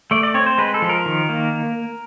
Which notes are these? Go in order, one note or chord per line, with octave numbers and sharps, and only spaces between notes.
A3 D5
D5
C4 C#5
C5
G#3 B4
A4
F3
A#4
D#3
A#3